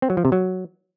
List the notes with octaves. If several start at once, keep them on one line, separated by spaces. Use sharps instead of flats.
C4
F#3
F3
C3
F#3